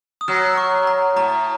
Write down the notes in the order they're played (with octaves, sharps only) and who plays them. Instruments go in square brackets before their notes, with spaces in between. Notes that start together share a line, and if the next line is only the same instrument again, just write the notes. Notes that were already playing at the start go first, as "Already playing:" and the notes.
[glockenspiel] D#6
[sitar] F#3 [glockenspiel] F6
[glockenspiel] C#6
A#5
[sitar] A2 [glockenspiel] A#5